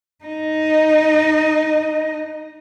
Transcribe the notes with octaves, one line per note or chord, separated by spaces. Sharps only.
D#4 D#5